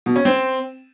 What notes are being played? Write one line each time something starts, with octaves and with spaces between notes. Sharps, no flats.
B2
C#4
C4